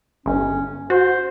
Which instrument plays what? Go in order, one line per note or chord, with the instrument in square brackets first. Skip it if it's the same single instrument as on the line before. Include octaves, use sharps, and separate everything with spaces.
[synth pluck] G1 [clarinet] C#4
[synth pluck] F#4 [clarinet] C5